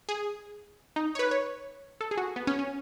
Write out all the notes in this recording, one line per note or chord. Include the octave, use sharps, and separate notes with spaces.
G#4
D#4
C#5
B4
C#5
A4
G#4
F#4
B3
C#4
C#4